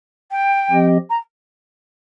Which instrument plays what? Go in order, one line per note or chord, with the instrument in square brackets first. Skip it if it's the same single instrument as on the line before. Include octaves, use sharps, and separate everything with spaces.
[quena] G5
[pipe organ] F3 C4 G4 D#5
[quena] A#5